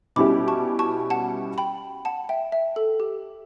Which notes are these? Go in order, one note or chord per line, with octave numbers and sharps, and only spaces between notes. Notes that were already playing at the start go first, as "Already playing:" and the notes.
B2 G3 C#4 E4 G4 B5 D6
A5 C#6
A5 C#6
F#5 A5
G5 B5
F#5 A5
E5 G5
E5
A4
G4